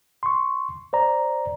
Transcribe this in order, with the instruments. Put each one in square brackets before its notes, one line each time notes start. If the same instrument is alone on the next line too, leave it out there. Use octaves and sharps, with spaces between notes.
[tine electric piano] C6 C#6
C5 D5 A#5